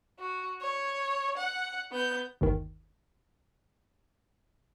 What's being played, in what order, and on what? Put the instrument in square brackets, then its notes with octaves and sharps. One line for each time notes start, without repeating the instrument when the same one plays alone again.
[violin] F#4
C#5
F#5
B3 G6
[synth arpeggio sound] G1 D#2 D#3